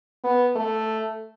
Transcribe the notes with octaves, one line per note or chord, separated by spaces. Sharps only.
B3
A3